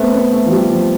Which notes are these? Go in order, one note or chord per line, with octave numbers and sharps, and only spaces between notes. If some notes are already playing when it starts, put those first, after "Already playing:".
Already playing: A3 B3 C4
B3
A3
F3
G3
F3